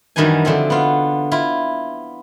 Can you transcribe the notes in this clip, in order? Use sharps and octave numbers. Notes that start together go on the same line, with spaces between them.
F#2 D#3 E3 G3 D4 G#5
D3 F3 C4 E5
B3 F4
E4 F4